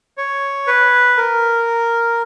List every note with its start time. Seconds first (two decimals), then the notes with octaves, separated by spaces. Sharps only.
0.18 C#5
0.67 B4
1.17 A#4